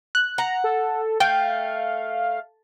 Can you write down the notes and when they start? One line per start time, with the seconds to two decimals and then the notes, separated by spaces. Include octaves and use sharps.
0.15 F#6
0.38 F#5 A#5
0.64 A4
1.20 A3 F5 G5